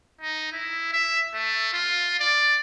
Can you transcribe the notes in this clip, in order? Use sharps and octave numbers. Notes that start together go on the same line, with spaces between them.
D#4
E4
E5
A3
F4
D5